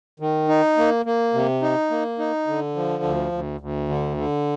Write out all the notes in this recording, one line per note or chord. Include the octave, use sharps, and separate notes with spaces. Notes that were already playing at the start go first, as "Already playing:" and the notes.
D#3
D#4
A#3
A#3
C3
D#4
A#3
D#4
D3
F3
D2
D2
D2
D3
D3